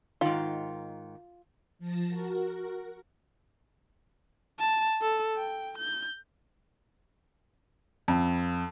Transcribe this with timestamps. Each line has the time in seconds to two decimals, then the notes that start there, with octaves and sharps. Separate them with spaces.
0.21 G#2 D#3 F4
1.79 F3 A5 A#6
2.08 F#4 A#4
4.60 A5
5.02 A4
5.37 G5
5.78 G6
8.08 F2